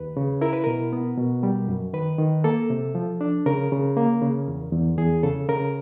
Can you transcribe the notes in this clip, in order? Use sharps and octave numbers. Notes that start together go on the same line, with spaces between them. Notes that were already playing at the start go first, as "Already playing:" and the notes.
Already playing: D#2 B4
C#3
E4 A#4
B4
B2 A#4
B3
B2
G3
F#2
D#3 B4
D#3
A#3 A4
C3
F3
D4
C#3 A#4
C#3
A#3
C#3
E2
E2
E2 G#4
C#3 A4
C#3 A#4